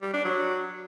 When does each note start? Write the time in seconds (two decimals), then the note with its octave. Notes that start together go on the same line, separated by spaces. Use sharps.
0.02 G3
0.14 D4
0.25 F#3